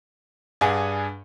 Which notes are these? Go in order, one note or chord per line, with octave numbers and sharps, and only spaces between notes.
G2 D4 G#4 F#5 G#5